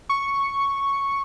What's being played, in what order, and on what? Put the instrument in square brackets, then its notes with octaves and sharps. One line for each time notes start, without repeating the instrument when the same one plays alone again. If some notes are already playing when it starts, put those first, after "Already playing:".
[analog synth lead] C#6